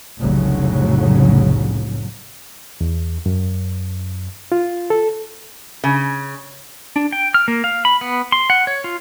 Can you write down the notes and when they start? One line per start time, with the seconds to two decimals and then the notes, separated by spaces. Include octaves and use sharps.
0.20 F1 C2 A2 C#3 F#3
2.81 E2
3.26 F#2
4.52 F4
4.90 A4
5.84 C#3
6.96 D4
7.12 G5
7.34 F6
7.48 A#3
7.64 F5
7.85 B5
8.01 B3
8.32 C6
8.50 F#5
8.67 C#5
8.84 F4